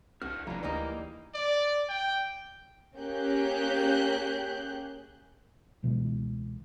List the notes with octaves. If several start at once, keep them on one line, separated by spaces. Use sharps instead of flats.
C2 G2 F#4 A4 F6
F1 F2 A2 E3 F#3 D4 F4 A#5
D2 G3 G#3 A#3 D#4
D5
G5
A#3 C#4 G4 G#4 F#6 G6
C#2 B2 E3 G#3